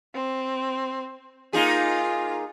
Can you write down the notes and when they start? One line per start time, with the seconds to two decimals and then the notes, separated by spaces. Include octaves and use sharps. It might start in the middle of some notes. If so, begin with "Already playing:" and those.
0.15 C4
1.53 A#3 D#4 F4 G#4